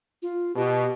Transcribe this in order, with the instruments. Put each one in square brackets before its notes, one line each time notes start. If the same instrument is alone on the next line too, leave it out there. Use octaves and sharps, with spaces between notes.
[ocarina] F4
[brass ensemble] B2 [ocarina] G4